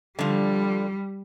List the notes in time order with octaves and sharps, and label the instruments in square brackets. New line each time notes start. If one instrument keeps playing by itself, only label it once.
[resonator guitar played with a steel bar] D3 F3 [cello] G3